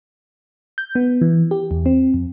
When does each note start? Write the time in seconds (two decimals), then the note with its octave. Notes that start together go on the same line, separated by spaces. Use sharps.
0.78 G6
0.95 B3
1.21 E3
1.51 G4
1.71 E2
1.86 C4
2.14 F2